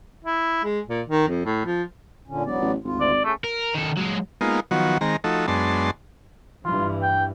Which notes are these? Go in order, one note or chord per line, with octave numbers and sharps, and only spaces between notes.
E4
G#3
A#2
D#3
F2
A2
F3
A#2 D3 C#4
E1 F#3 B3 D5
A1
G#1 D2 F4
D5
A3 C#4 G#4
A#4
D#3 A4
F#3 G#3
G#3 A#3 B3 D#4 F4
D#3 F3 F#3 B3 F#4
D#3 G#3 C4 A#5
F3 A3 D#4 F#4 A4
F#2 G#3 B3 D4 A5 C6
G2 E3 F4
G5